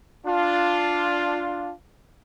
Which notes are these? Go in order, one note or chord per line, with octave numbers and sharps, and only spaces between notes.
D4 F4